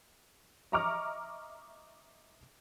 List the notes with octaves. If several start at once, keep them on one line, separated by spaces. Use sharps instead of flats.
D#5 E5 A#5 C#6 D6 F6